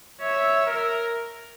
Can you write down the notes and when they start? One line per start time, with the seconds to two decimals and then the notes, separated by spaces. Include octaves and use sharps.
0.21 C#5 E5
0.66 A#4